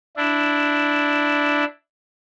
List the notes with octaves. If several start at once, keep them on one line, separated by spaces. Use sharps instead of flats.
D4 E4